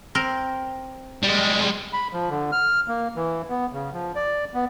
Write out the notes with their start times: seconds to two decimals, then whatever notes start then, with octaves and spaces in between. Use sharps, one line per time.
0.15 C4 A#4
1.23 G3 G#3
1.93 B5
2.13 F3
2.29 D3
2.52 F6
2.88 A#3
3.16 E3
3.50 B3
3.73 C#3
3.93 F3
4.15 D5
4.54 B3